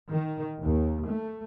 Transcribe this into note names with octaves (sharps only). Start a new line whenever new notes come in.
D#3
D#2
A3